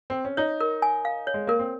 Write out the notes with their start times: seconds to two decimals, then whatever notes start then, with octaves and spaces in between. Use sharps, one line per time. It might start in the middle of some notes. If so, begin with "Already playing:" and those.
0.10 C4
0.25 C#4
0.37 D#4 C#5
0.61 A#4
0.82 G#5
1.05 F5
1.27 C#5
1.34 G#3
1.47 A#3 A#4
1.59 C4